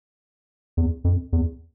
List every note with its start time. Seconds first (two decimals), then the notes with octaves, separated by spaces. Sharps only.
0.77 E2
1.04 F2
1.33 E2